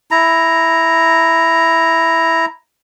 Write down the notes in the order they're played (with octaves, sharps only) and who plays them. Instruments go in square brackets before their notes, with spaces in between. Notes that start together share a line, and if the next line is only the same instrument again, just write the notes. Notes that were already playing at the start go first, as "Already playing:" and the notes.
[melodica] E4 A#5